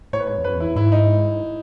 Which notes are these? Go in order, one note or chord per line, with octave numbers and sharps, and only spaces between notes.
A2 C#5
B4
G#2 C#5
E2
F#2 B4
E2
E4
G#2 E4
D#4